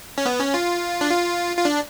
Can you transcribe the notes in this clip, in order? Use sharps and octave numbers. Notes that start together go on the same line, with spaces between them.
C#4
B3
C#4
F4
D4
F4
F4
D4